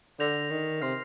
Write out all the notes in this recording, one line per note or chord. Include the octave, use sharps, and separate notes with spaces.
D3 G6 A#6 F7
D#3
C3 C6 F6 C7